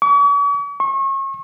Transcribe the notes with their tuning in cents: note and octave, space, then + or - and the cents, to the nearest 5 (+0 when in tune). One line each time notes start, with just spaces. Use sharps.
C#6 +45
C#6 -35